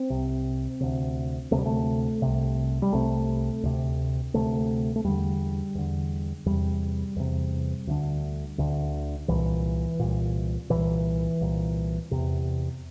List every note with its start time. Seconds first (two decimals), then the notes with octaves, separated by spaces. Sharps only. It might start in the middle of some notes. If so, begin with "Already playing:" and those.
Already playing: C4
0.10 C2 C3
0.80 D2 C3
1.51 D2 C3 A3
1.58 G3
1.66 A3
2.22 C2 C3
2.82 G3
2.93 C2 C3 A3
3.63 D2 C3
4.34 D2 C3 A3
4.96 A3
5.04 E2 D3 G3
5.75 E2 D3
6.46 E2 C3 G3
7.16 E2 C3
7.87 D2 D3
8.58 D2 D3
9.28 C2 A#2 E3
9.99 C2 A#2
10.70 C2 A#2 E3
11.41 C2 A#2
12.11 E2 C3